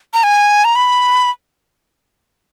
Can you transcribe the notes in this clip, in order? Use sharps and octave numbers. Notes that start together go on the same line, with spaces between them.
A#5
G#5
A#5
B5